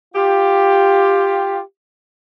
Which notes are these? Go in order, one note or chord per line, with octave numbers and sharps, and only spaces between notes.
F4 G4